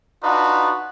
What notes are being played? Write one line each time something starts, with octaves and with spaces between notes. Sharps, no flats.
D4 D#4 F4 F#4 B4